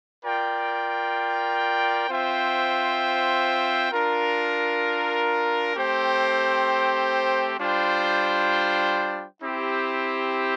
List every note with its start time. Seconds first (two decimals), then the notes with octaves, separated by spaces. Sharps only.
0.24 F4 A#4 D5 G5
2.09 C4 F4 C5 E5 G5
3.92 D4 F4 A#4
5.75 A3 C4 G4 C5 G5
7.59 G3 D4 F4 C5 G5
9.42 C4 E4 G4